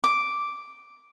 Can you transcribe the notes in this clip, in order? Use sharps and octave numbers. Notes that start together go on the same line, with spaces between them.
D6